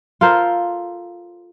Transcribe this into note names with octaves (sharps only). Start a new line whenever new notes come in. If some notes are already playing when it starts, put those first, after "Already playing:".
F4 A4 A#4 C5